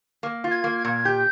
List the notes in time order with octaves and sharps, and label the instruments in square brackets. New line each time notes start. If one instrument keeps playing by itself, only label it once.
[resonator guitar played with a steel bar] A#3
F4
[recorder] G#6
[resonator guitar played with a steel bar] A#3
[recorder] G#6
[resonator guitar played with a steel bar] A#2
[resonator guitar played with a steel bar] G4 [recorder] G6